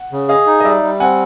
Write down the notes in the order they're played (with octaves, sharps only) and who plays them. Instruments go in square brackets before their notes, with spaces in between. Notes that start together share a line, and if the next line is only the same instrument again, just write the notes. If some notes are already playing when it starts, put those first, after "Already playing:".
Already playing: [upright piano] F#5
[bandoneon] C#3
[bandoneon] G#4 [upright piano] D#5 F5
[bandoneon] D#4
[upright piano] D#5
[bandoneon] G3 [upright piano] D5 E5
[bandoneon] G3
[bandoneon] C4 [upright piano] F#5 G#5